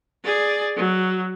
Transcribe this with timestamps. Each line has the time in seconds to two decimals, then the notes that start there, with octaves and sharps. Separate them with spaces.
0.24 G#4 D5
0.77 F#3